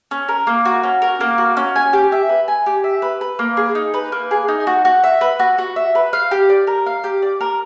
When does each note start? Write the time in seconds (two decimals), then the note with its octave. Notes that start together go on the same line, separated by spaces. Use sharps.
0.11 C#4
0.28 A#4
0.47 A#3
0.65 F#4
0.83 C#4
1.02 A#4
1.21 A#3
1.38 F#4
1.57 C#4
1.76 G#5
1.93 G4
2.12 E5
2.29 B4
2.48 G#5
2.66 G4
2.84 E5
3.02 B4
3.21 B4
3.39 A#3
3.57 G#4
3.75 D#4
3.94 B4
4.12 A#3
4.31 G#4
4.48 D#4
4.67 F#4
4.85 F#4
5.04 E5
5.21 B4
5.39 F#4
5.58 F#4
5.76 E5
5.95 B4
6.13 F5
6.31 G4
6.49 D5
6.67 A#4
6.86 F5
7.04 G4
7.22 D5
7.41 A#4